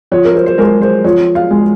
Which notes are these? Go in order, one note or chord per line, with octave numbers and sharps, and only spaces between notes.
F3 C#5
A#4
C5
C5
G#3 A#4
C5
F3 C#5
F5
G#3